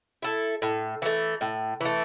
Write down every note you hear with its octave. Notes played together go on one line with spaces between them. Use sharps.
E4 A4
A2
E3 A3
A2
E3 A3